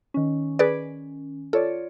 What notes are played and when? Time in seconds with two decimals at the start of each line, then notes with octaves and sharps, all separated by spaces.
0.14 D#3 C#4
0.59 G#4 B4 D5
1.53 F4 A4 C#5 D5